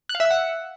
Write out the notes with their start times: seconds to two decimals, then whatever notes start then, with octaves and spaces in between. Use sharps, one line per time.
0.09 F#6
0.15 F5
0.20 E5
0.25 E6
0.30 F#5